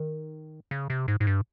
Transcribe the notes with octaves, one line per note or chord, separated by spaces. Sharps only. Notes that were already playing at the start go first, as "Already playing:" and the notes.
Already playing: D#3
C#3
C3
G#2
G#2
G2